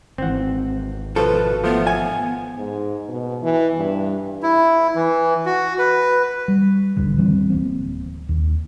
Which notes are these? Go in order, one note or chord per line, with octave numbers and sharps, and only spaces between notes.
G#1 G#2 E3 C4 F#5
B2 F3 A4 B4
F3 A3 B3
G#5
G#2
B2
E3
G2
E4
E3
F#4
B4
G3
A1 D2 G2 D3
D#3 E3 G3 C4
D1 A#3 C4
D#2